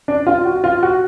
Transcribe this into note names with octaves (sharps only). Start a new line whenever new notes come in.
D4
F4
F#4
F4
F#4